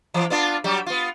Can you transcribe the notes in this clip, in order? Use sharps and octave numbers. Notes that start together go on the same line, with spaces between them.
E3
B3 D4 F4
F#3 G3 G4
B3 F4